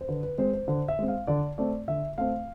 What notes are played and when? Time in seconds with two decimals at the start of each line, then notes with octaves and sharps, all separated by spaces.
0.01 C5
0.08 D3 B4
0.23 B4
0.38 G#3 C4 C5
0.53 C5
0.68 D3 C5
0.88 E5
0.99 G#3 C4
1.08 F5
1.27 D3 D5
1.58 A3 C4 D5
1.88 D3 E5
2.18 A3 C4 F5